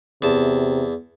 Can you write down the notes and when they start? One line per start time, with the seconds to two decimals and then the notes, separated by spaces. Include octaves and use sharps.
0.22 E2 C3 A5